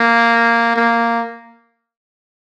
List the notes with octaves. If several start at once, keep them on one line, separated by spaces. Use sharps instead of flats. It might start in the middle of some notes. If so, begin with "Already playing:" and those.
Already playing: A#3
A#3